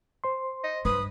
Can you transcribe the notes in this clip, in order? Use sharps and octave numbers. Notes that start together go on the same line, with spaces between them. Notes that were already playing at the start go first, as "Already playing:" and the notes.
C5 C6
D#5
G2 D4 B4 D#6